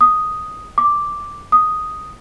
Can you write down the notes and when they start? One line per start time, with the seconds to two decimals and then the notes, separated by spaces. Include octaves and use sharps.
0.01 D#6
0.78 D6
1.52 D#6